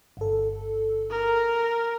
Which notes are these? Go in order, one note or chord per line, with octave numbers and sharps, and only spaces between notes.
G1 A4
A#4